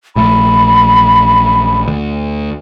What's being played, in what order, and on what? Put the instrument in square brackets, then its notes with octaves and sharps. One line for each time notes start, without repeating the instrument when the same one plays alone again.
[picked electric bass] A#1 A3 [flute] B5
[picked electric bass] D2